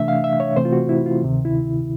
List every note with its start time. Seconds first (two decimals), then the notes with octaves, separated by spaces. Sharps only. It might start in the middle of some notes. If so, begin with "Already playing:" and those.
Already playing: C3 E3 A3 D4 E5
0.08 F5
0.24 E5
0.40 C#5
0.56 C3 E3 A3 C4 C5
0.65 F4
0.73 F#4
0.89 E4
1.06 F4
1.22 D2 C3 D#3
1.45 E4